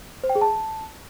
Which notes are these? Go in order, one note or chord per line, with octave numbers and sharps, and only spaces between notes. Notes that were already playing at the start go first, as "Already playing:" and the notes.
C5
G5
G#4
A5